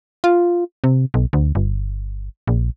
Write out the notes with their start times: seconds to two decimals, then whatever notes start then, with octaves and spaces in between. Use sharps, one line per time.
0.24 F4
0.84 C3
1.14 B1
1.33 D2
1.55 G1
2.47 A#1